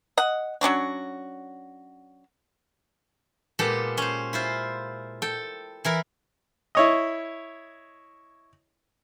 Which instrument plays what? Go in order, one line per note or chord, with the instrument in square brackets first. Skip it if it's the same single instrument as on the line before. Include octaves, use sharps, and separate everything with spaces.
[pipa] D#5 F#5
F#3 C#4 D4 F#4
[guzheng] A#2 G#3 B3 G4 A4
C#4 C5
E4 F4 C5
A4 G5
E3 E4 A#4
[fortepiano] E4 C#5 D#5